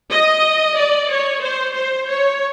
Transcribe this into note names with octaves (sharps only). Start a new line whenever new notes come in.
D#5
D5
C#5
C5
C5
C#5